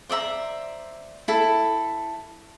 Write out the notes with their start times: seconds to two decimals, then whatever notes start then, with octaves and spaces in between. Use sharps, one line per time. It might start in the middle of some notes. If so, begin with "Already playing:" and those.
0.09 C5 D5 E5 A#5
1.28 E4 A4